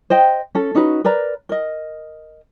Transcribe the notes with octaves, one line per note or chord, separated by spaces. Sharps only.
C5 D#5 G5
C#4 A4
C#4 D#4 F#4 B4
A#4 B4 D5 A#5
A#4 D#5